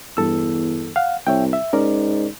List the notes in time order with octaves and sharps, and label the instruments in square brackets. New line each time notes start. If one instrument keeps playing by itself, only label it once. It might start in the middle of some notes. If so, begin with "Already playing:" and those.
[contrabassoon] E2 [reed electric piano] G2 A4 E6
[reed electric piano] F5 F#5
[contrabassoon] C2 [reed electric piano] C#5 E5 G5
[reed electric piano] E5
[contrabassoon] G#2 [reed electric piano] C#4 A#4 D5